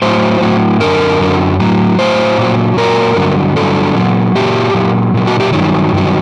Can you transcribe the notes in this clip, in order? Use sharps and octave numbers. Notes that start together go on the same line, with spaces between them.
A2 F#3 C5
A2 F#3
F#2 D3 F#3 A#4
F#2 D3 F#3
A2 F#3
A2 F#3 C5
A#2 F#3
A#2 F#3 A#4
G2 D3 F#3
G2 D3 F#3 A4
A#2 F#3
A#2 F#3 G4
A#2 F#3
A#2 F#3
F#4
G4
G2 D#3 F#3
G2 D#3 F#3